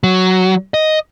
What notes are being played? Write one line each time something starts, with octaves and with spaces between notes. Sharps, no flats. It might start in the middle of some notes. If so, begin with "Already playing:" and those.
F#3
D#5